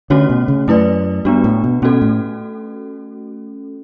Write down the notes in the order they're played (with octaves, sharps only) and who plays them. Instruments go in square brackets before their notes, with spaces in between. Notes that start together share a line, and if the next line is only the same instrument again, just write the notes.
[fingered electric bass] D3 [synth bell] A3 C#4 F#4 C#5
[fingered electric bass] B2
C#3
[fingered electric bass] F#2 [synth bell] A3 E4 B4 D5
[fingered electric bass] G2 [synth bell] B3 D4 F#4
[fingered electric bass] A2
B2
[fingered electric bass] B2 [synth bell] A3 C#4 F#4 A4
[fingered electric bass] A2